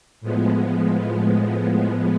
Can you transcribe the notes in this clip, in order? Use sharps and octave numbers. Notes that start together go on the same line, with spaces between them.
A2 F3 G#3 B3